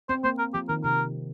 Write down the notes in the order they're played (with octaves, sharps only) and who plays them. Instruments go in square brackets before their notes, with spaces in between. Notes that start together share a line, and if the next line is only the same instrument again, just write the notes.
[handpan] C4 [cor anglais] C5
[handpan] A#3 [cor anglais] C5
[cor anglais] A#4
[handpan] F3 [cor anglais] G4
[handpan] D#3 [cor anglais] A#4
[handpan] C3 [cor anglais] A#4